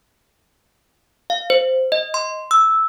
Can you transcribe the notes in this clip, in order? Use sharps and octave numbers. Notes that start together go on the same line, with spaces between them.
F5
C5
D#5
C6
E6